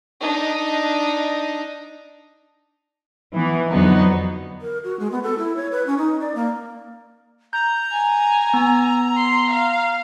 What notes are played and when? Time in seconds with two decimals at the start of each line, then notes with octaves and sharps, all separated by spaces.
0.21 D4 D#4
3.34 E3 B3
3.69 F2 D3 F#3 B3 D#4
4.61 A#4
4.84 F#4
5.00 G#3
5.12 B3
5.23 A4
5.38 E4
5.57 C#5
5.72 B4
5.86 C#4
5.98 D#4
6.21 D5
6.35 A#3
7.53 A#5 G6
7.92 G#5
8.54 B3
9.17 C6
9.50 F5